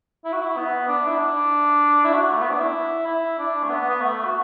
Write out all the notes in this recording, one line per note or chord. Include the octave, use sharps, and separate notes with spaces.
E4
F#4
E4
B3
D4
E4
D4
E4
F#4
A3
B3
D4
E4
E4
D4
A3
B3
B3
A3
F#4